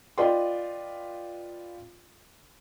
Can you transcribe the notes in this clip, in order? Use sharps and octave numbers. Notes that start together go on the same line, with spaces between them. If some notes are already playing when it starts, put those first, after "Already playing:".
F4 B4 D5 D#5 G5 C6